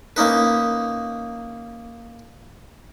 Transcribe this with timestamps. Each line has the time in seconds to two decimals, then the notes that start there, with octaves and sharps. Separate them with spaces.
0.16 A#3 C#4 D#4 B4